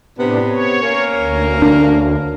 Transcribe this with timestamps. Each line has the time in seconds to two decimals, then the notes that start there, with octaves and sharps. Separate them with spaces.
0.18 A2 C3 B3 D4
0.49 C#5
0.82 A#3 C#4 A#4
1.15 D2
1.62 D4